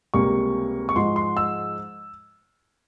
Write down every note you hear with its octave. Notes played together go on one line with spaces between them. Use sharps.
C#2 C3 G3 A#3 C#6
C#6
G#2 F3 G#3 C6
C6
E6